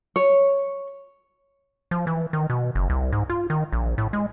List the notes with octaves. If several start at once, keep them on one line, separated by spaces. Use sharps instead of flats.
C#5
F3
E3
D#3
B2
F#1
C2
G#2
F4
D#3
A#1
A2
G#3